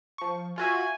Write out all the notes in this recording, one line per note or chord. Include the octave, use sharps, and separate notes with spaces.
F3 C#6
F4 F#4 E5 G#5